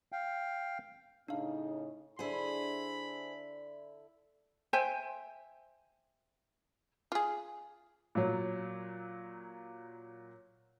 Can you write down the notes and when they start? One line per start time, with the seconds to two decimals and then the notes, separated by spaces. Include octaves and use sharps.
0.12 F5 G5
1.28 A2 C#3 D4 D#4 F5
2.19 D3 E4 G#4 C5 B5
4.73 C5 E5 G5 G#5
7.12 F4 G#4
8.15 A#2 F#3